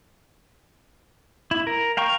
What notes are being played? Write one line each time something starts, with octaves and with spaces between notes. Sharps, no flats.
E4
A#4
F5 G5 A#5 C#6